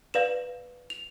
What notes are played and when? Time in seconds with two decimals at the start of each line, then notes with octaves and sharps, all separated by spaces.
0.14 B4 D5 F5 E7
0.90 F7